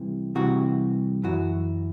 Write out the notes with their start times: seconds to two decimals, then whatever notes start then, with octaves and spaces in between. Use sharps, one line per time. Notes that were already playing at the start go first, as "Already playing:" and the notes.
Already playing: C2 C3 E3
0.35 C2 C3 E3 F#4
1.23 F#2 E3 F#4